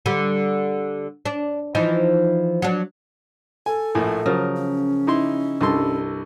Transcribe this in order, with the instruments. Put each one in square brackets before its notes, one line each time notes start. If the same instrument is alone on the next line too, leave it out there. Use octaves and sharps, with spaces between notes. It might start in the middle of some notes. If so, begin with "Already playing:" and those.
[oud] D3 G3
D4
E3 F3 D#4
F#3 D4
[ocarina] A4 [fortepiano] G#5
[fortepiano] A#1 A2 G#5
[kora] C#3 F3 F#3 [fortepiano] A#4
[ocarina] C#4
[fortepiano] D#4 E4 C6
[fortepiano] C2 D#5 C6 [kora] G2 A4